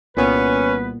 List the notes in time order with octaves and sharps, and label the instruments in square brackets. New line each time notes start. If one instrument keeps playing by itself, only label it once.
[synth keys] C2 B3 [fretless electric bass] A#2 [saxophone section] C#4 [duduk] B4